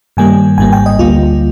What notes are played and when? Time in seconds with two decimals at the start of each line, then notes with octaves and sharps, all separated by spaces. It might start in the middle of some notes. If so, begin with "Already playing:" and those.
0.17 G2 D#3 G3 A#3 G#5
0.58 G#1 G#2 G3 A#3 G#5
0.72 G5
0.86 D#5
0.99 D2 D3 G3 A#3 F4